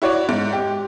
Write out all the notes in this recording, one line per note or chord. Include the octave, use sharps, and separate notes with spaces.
E4 F#4 C#5 D5
G#2
G4